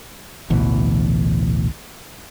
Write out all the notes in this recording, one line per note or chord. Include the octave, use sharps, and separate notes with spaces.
A1 D2 B2 E3